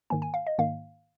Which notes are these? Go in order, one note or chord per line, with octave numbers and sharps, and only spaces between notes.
G#2 D#3 A#3 G#5
G#5
F5
D#5
G#2 D#3 A#3 F5